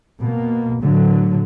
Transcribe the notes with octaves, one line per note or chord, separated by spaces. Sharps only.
B2 A#3
A2 D3 F#3